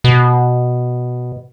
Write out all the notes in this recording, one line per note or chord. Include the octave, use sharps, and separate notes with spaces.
B2